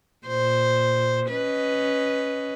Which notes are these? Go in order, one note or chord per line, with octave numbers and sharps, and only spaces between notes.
A#2 C5
C#4 B4 D#5